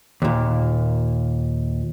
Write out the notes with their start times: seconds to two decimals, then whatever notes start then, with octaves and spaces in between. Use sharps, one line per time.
0.22 D#2 A#2